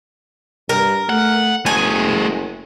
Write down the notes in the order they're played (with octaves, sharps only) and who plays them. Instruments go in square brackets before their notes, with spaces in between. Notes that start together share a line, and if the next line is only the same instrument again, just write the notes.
[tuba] G2 [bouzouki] A#4
[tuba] A3 [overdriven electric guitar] F#5
[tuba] F#1 [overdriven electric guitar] A3 G#4 [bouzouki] G#5